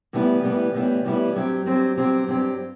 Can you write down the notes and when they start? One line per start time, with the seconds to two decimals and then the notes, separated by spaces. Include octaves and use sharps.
0.13 A2 E3 G3 B3 E4
0.43 A2 E3 G3 B3 E4
0.74 A2 E3 G3 B3 E4
1.05 A2 E3 G3 B3 E4
1.36 G2 F#3 C4 G4
1.66 G2 F#3 C4 G4
1.97 G2 F#3 C4 G4
2.28 G2 F#3 C4 G4